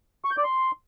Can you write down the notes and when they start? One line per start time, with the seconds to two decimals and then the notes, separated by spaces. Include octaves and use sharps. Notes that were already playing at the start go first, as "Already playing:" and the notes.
0.25 C#6
0.31 G6
0.37 D5
0.44 C6